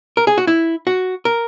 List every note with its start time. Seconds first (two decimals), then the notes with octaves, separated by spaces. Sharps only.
0.17 A#4
0.27 G#4
0.38 F#4
0.47 E4
0.87 F#4
1.25 A#4